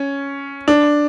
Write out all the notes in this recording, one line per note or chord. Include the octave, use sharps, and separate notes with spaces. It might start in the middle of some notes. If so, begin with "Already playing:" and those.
Already playing: C#4
D4